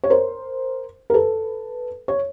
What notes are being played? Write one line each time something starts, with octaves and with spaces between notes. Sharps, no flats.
C#5
A#4 C5
A#4
A4 B4
C#5